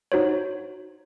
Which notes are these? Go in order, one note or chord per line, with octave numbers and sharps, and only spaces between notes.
D#4 F#4 C5 C#5